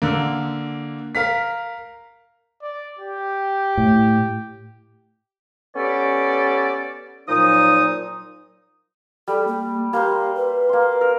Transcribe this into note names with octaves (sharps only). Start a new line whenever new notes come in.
D3 A#3
A#4 F5 B6
D5
G4
A2
B3 C#4 G4 A4 D5
A#2 F3 F#3 D#4 D#6
G3 A4
A#3
A#3 G4 C5
B4
A#3 C6
A#4